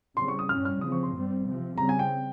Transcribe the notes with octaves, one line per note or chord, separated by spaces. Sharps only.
C#3 G3 C4 C6
C#6
D#6
G2 G3 C#4 F6
F6
C#3 F3 C4 D#6
C#6
C6
G2 G3 C4
C3 F3 C4
C#3 G3 C4 A#5
G#5
G5